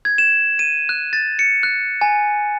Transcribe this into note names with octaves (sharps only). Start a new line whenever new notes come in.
G#6
E7
D#7
F#6
A6
C#7
F#6
G#5